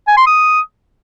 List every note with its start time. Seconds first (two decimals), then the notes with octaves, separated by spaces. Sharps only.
0.08 G#5
0.17 C6
0.27 D#6